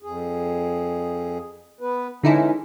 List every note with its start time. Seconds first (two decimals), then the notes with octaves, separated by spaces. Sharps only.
0.03 F2 G#4
1.81 B3 B4
2.23 D3 E3 G#3 C#4 D#4 E4